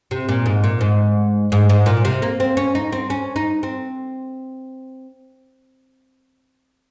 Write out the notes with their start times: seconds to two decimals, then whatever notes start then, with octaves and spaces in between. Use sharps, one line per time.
0.11 C3
0.29 A#2
0.46 G#2
0.64 A#2
0.81 G#2
1.52 G#2
1.70 G#2
1.86 A#2
2.05 C3
2.22 A#3
2.40 C4
2.57 C#4
2.75 D#4
2.92 C4
3.10 C#4
3.36 D#4
3.63 C4